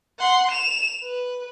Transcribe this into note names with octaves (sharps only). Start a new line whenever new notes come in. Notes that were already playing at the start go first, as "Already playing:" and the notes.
F#5 C6
E7 F7
B4